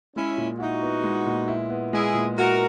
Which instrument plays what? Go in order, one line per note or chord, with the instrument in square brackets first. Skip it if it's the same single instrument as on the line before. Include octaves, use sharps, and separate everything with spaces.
[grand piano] G#3 [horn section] C#4 E4
[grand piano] A#2
[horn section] D#4 F#4 [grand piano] E4
[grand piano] B3
G#3
A#2
E4
B3
[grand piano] G#3 [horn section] E4 G#4
[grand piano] A#2
[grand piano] E4 [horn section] F#4 A#4